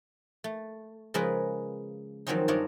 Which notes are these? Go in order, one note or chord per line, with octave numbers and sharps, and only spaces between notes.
A3
C#3 F3 G#3 G#4 A#4 B4
D#3 F3 F#3 C4 C#4 D#4
G2 D4 F4 A#4 C#5 D#5